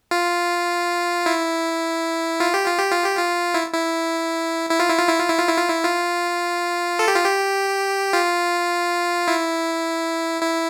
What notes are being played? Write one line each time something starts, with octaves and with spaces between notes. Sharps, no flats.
F4
E4
F4
G4
F4
G4
F4
G4
F4
E4
E4
E4
F4
E4
F4
E4
F4
E4
F4
E4
F4
E4
F4
A4
G4
F4
G4
F4
E4
E4